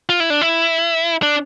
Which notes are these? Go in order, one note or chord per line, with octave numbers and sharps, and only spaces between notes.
F4
E4
D4
E4
D4